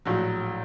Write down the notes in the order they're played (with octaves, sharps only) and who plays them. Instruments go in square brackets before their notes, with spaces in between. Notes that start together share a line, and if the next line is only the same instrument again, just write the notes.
[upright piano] A#1 A2 F#3